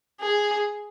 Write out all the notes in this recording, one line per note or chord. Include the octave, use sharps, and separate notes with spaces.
G#4